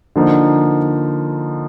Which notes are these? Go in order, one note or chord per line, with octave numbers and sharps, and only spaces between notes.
D3 F3 A#3 D#4